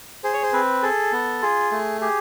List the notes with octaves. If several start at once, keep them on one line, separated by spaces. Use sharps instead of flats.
G#4 C5
C#5
C5
C4 B4
G#4 A4
B3
F4 G#4
A3
G4 G#4